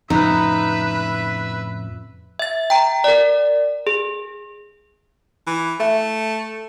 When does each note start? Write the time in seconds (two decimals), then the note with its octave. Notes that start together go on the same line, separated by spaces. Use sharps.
0.10 F2 A2 C#3 D#4 B4 E5
2.39 E5 A6
2.70 G5 A#5
3.04 A#4 D5
3.87 G#4
5.47 E3
5.80 A3 E5